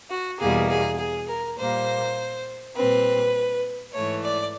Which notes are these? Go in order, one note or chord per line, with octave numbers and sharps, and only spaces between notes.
F#4
E2 B2 G3 A#3 G#4
G#4
G#4
A#4
A#2 G3 A#3 C5
A#2 G3 C4 B4
G#2 E3 A3 C#5
D5